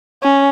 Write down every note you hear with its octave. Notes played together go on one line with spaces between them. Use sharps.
C#4